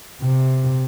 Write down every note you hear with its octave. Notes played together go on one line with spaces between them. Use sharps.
C3